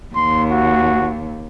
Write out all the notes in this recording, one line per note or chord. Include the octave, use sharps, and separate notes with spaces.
D#2 C6
F#4